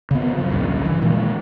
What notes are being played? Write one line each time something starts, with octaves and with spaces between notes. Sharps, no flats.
C#3 B3
F#2 F3
D1 A#1 G2 C#3
E3
A#2 D#3 G#3 A#3